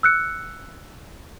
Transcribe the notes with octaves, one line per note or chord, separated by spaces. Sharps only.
E6 F#6 C#7